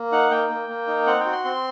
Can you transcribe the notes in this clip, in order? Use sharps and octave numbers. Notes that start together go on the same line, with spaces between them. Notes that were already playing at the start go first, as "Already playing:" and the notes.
Already playing: A#3
D#4 F#5
A#3 G5
A#3
A#3
D#4
C4 F#5
G5
F#4
C6
C4 C6